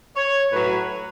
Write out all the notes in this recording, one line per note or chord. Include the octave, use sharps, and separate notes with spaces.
C#5
A2 F#3 B4